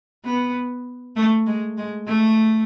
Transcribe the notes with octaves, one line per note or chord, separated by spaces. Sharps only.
B3
A3
G#3
G#3
A3